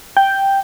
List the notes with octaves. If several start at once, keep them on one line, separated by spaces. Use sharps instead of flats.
G5